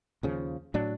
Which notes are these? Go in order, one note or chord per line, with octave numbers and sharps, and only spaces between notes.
D#2 C#3 F3
A2 F#3 D4